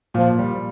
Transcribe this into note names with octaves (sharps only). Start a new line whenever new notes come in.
A#2 F3
G3